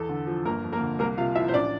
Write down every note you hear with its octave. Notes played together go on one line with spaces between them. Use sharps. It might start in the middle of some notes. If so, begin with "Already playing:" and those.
Already playing: E2 E3 A4
D3
F3
G1 A#3 A#4
F2
A#3 A#4
D3
C2 A#3 A#4
C3 F4 F5
F3 E4 E5
C5
A1 D4 D5